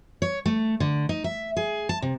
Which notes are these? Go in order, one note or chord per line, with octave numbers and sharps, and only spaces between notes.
C#5
A3
D3
D#4
E5
G#4
A5
C3